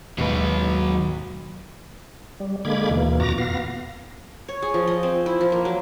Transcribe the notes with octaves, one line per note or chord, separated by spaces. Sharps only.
D#2 G#2 B2 F#3 B4
G3
D3 G#3 A#3 B5 D6 G#6
D#2 B2 E3 A#3
F2 A#2 F#4 A#5 D6 A#6
B3 F5 A#6
C#5
G#4
F3
D#5
C4
E4
F3
A#3
F#3